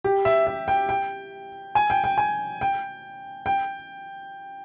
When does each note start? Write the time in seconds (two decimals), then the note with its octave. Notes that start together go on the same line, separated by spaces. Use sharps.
0.04 G4
0.25 E5
0.47 E5
0.68 G5
0.89 G5
1.75 G#5
1.90 G5
2.04 G5
2.18 G#5
2.61 G5
3.46 G5